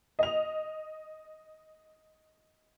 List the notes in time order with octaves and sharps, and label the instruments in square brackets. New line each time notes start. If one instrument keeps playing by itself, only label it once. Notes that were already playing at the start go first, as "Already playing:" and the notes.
[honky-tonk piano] D#5 F7